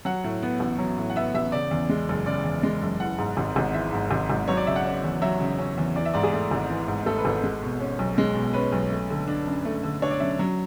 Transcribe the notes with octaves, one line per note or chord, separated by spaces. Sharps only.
F#3 F#5
A2
B3
A1
F#3
A2
F#5
B3 E5
A1 E5
C#3 D5
E2
G#3
F#1
C#3 D5
E2
G#3
F#1
E3 F#5
G#2
G#1
G#1
E3 E5
G#2
G#1
G#1
F#3 C#5
D5
C#3 E5
F#5
C#4
E2
F#3 E5
C#3
C#4
E2
E3 D5
E5
G#2 D5
G#4
A3
G#1
E3
G#2
A3 A4
B4
G#1 A4
G#3
B2
C#4
B1
G#3
B2
C#4 B4
B1
A3
D3
D4
F#2
A3
D3
D4 C#5
D5
F#2 E5
F#3